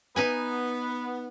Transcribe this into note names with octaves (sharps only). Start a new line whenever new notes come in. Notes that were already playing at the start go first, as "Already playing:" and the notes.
B3 D#4 B4 G#5